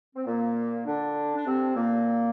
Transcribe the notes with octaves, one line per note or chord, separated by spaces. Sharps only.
C4
A#2 A#3
D3 D4
D4
C3 C4
A#2 A#3